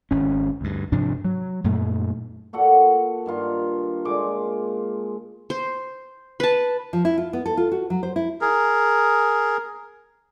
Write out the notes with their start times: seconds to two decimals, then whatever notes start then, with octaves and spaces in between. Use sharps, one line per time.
0.11 G#1 C#4
0.61 D2 G2
0.92 G#2 C3 F3 D4
1.25 F#3
1.64 F#2 A#2 A3
2.53 A#2 F#4 A4 F#5
3.26 G2 D#3 F4
4.05 A#2 G#3 C#6 D6
5.50 C5
6.40 B4 A5
6.93 F3
7.05 E4
7.18 F4
7.33 B3
7.46 A4
7.57 F4
7.72 F#4
7.90 F#3
8.03 C5
8.16 E4
8.41 G#4 A#4